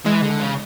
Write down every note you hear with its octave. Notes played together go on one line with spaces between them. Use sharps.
E3 G#3
D3
C#3